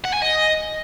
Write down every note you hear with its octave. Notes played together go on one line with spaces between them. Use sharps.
F#5
G#5
D#5